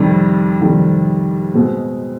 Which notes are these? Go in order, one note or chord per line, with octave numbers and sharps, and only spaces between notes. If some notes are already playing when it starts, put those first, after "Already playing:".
Already playing: F2 C3 D#3 G3
F2 C3 D#3 G3
B2 G#3 C4